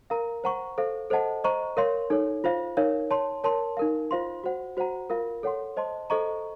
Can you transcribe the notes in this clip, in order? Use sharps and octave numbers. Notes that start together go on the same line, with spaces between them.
A#4 F5 A#5
C5 F#5 A#5 C#6
A4 C5 F5
A4 C5 D#5 F#5 A5
C5 D#5 A#5 C#6
A#4 C#5 F5 C6
D#4 A4 C#5
F4 C5 F5
D#4 A#4 C#5 F5
C#5 A5 C6
A#4 C#5 A5 C6
D#4 A#4 F5
F4 C5 F5 C6
F#4 C5 F#5
F#4 C5 F#5 A#5
F4 A#4 F5
A4 C#5 F#5 C6
C5 D#5 A5 C6
A4 C5 D#5 A#5 C#6